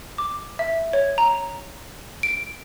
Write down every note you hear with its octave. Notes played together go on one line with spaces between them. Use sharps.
D6
E5
C#5
A#5
D7